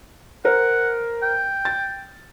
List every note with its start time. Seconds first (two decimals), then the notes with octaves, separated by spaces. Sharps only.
0.45 A#4 C5 F#5
1.22 G5
1.65 A6